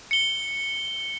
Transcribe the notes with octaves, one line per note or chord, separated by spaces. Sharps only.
C#7 G7